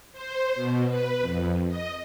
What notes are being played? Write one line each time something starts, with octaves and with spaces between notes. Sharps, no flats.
C5
B2
B4
F2
D#5